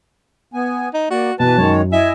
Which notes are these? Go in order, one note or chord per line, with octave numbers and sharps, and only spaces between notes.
B3 G#5
D#4
A#3 F#4 D5
B2 E3 B4 A5
F#2 D#3 G#3 C#5
E4 D#5 E5 G#5